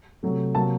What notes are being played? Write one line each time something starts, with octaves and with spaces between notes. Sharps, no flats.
C3 F#3 A3
C3 F#3 A#3 A5